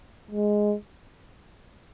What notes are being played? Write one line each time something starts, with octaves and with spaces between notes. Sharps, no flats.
G#3